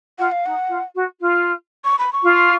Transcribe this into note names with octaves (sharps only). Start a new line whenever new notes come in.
F4 F#5
F5
D#4 F#5
F4
F#4
F4
C#6
B5
C#6
F4